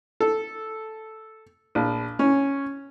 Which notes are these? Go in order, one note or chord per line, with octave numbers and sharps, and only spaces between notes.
A4
A#1
C#4